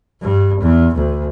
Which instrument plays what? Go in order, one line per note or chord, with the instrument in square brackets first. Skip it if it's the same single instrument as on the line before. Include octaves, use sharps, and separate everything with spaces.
[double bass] G2
E2
D2